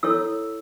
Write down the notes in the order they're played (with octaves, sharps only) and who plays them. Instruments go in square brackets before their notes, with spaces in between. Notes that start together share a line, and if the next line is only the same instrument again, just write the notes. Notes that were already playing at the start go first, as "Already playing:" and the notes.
[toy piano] E4 A4 C#5 E6